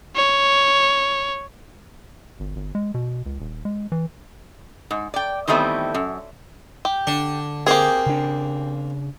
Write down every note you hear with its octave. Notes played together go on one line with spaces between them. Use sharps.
C#5
G1
G1
G#3
B2
C#2
D#1
G#3
E3
G#2
D5 G5
D#3 E3 G3 A3 B3 C4
F#2
G4
D3 D4
A#3 C4 G4 G#4
C#3 D4